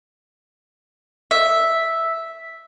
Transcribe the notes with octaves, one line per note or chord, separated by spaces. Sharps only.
E5